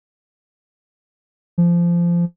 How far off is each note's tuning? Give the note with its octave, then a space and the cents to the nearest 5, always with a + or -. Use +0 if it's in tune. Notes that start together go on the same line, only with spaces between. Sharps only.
F3 -20